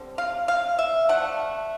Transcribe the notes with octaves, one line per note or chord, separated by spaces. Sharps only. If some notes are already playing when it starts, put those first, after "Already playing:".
Already playing: D3 G3 C4
F5
F5
E5
D3 F3 A3 D4 F#5